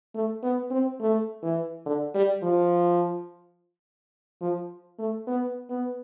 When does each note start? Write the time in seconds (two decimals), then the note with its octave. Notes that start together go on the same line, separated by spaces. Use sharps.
0.15 A3
0.43 B3
0.71 C4
1.00 A3
1.43 E3
1.86 D3
2.14 G3
2.43 F3
4.41 F3
4.99 A3
5.27 B3
5.70 B3